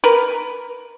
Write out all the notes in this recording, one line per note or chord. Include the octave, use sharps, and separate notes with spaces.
A#4 B4